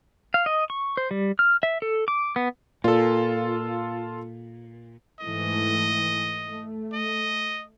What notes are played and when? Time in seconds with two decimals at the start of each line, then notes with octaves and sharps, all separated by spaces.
0.34 F5
0.46 D#5
0.70 C#6
0.97 C5
1.11 G3
1.39 F6
1.63 E5
1.82 A4
2.08 D6
2.36 B3
2.84 A#2 F4 A4
5.20 G#2 E3 A3 D#5
6.46 A3
6.93 D#5